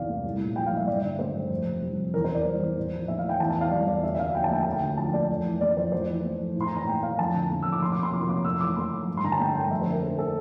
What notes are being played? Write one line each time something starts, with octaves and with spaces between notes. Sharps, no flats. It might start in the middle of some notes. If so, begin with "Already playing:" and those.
Already playing: E2 G2 C3 E3 D5 F5
A3
C2
A#2
F3 G5
F5
C2
E5
G2 D5
D3
A3 C5
G2
F2
C3
G3
F2
E2 A#4
C5
E3
D5
G3
E2
A2
F3
A3 E5
F5
A2
G5
E2 A5
A5
E3
F5
G3 D5
E2 D5
D2 E5
E5
D3 F5
F3 G5
A5
A3 G5
D2 A5
G5
D3
F3 A5
A3 D5
F2
E3
A3 D5
F2 C5
F2 C5
E3
A3
F2
A2 C6
A#5
E3
A#5
A3 G5
A2 F5
F2 A5
D3
A3
F2 E6
D6
F2 C6
D6
C3
C6
F3 D6
C6
A3 D6
F2 E6
E3 D6
A3 C6
F2
G2
C6
D3 A#5
A5
A3 G5
G2 G5
F2 E5
C5
D3
A#4
A3 A4
A4